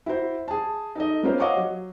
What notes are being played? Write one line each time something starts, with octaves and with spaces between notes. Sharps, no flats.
E4 F#4 C5
G#4 A5
D#4 A4 D#5
A#3 B3 C#4 F4 A#4 C5
C#5 D#5 F5 F#5 C#6 D6
F#3